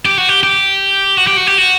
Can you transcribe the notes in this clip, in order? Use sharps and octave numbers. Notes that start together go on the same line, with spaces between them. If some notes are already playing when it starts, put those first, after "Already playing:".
G4
F#4
G4
G4
F#4
G4
F#4
G4
F#4